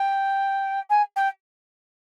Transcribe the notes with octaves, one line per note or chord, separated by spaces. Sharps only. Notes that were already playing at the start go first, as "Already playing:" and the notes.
Already playing: G5
G#5
G5